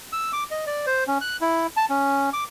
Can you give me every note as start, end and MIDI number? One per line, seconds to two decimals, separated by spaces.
0.13 0.32 88
0.33 0.44 86
0.51 0.65 75
0.67 0.86 74
0.86 1.04 72
1.08 1.18 61
1.21 1.37 90
1.41 1.67 64
1.77 1.85 81
1.90 2.30 61
2.33 2.44 86